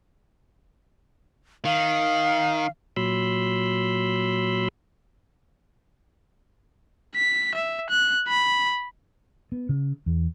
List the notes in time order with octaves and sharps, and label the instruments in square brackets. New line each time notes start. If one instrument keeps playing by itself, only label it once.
[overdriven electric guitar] D#3 [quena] F5
[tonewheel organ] A#2 F#3 B5 C6 E6
[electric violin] B6
E5
F#6
B5
[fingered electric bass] B3
C#3
E2